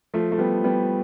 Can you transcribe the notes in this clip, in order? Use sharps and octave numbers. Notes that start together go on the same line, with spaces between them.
F3 A3
A3
G3 B3
G3 B3